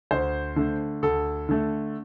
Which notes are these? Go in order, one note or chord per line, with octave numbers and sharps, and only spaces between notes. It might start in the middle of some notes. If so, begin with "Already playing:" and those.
D2 C5
D3 A3
D2 A4
D3 A3